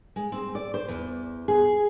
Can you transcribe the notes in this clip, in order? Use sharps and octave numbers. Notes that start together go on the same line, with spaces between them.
G#3
C4
D5
C5
E2
G#4